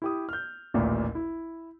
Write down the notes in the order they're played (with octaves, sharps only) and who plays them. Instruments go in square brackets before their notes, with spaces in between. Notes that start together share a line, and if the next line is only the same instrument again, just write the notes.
[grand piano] E4 G4 D#6
F6 G6
A1 D#2 A#2 D5
E4